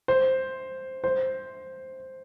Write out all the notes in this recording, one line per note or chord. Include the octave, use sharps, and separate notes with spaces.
C5
C5